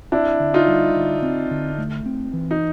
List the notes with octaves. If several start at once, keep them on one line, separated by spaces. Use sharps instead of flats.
C4 D4 E4
D3
D#4 F4
G3
D3
C4
D3
A3
C4
E3
D#4